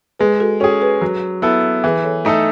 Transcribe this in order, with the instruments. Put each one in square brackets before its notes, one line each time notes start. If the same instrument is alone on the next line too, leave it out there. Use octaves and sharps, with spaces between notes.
[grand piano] G#3 [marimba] G#4 B4
[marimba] F#4 A4
[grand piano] C#4 [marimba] F#4 A4
[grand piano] G#4
[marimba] G#4 B4
[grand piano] F#3
B3 E4 A4
[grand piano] E3 [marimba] G#4 B4
[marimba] A4 C#5
[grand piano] A3 D#4 A4